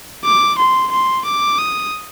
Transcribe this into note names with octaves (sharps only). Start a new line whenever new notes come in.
D6
C6
C6
D6
D#6